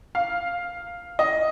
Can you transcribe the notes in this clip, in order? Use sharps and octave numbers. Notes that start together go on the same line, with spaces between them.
F5
D#5